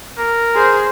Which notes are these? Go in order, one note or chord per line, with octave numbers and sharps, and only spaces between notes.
A#4
G#4 C5